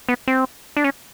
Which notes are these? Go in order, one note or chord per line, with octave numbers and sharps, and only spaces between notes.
B3
C4
D4
C#4